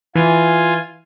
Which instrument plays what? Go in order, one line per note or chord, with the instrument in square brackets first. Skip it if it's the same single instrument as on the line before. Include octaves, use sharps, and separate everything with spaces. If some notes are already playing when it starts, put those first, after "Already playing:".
[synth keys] E3 [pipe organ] F4 G#5